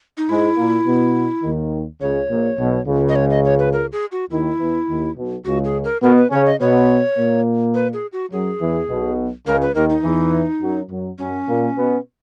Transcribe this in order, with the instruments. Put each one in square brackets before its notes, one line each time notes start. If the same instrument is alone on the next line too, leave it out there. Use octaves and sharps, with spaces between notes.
[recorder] D#4
[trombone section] G#2 G#3 [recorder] E4
[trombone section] A#2 A#3
B2 B3
D#2 D#3
[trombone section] C#2 C#3 [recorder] C#5
[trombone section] A#1 A#2
B1 B2
C#2 C#3
[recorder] D#5
C#5
D#5
C#5
B4
A#4
G#4
F#4
[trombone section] D#2 D#3 [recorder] E4
[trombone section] E2 E3
D#2 D#3
B1 B2
[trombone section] C#2 C#3 [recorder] F#4
[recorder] G#4
A#4
[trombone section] B2 B3 [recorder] A#4
[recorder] B4
[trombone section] C#3 C#4 [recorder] C#5
[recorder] D#5
[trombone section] B2 B3 [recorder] C#5
[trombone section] A#2 A#3
[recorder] B4
G#4
F#4
[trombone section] F#2 F#3 [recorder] G#4
[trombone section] E2 E3
B1 B2
[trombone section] C#2 C#3 [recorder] A#4
[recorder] B4
[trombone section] D#2 D#3 [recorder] A#4
[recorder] D#4
[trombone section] E2 E3
F#2 F#3
F#2 F#3
[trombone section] F#2 F#3 [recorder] C#4
[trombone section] A#2 A#3
B2 B3